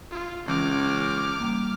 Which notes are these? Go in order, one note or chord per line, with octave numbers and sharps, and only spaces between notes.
F4
C#2 E3 C#4 D6 F6
G3 A#3